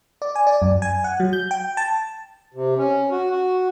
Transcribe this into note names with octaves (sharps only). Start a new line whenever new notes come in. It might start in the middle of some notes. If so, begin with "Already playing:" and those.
D5
G#5
D5
F#2
G#5
F#5
F#3
G6
G5
A5
C3
C#4
F#4
F#4